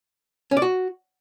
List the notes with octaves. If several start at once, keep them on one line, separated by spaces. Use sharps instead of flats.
C#4
D5
F#4